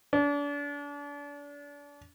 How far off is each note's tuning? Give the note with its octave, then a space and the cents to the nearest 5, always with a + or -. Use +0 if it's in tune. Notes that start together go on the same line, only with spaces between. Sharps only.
D4 -35